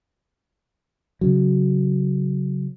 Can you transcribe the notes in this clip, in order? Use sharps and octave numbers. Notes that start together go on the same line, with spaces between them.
C#3 F#3